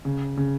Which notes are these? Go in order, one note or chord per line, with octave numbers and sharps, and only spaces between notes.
C#3
C#3